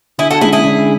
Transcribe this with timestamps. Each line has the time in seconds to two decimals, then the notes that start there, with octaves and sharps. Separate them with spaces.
0.18 D3 E4 G#4
0.31 F#4 A4
0.41 G#3 C#4 E4 G#4
0.52 E4 G#4
0.64 D3